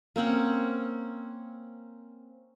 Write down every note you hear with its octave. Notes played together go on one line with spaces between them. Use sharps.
A#3 C4 C#4 F#5